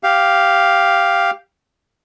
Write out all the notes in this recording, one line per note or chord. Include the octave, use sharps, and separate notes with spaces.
G4 F5